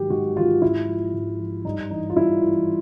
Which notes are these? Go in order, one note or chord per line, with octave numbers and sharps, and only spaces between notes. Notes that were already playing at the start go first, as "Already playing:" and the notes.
Already playing: G#2 D#3 F#3 G4
G#2 F#4
D#3 F#3 F4
G#2 E4
F3
G#2
F3
G2 D#4
E3 D#4
F4
G2 E4
E3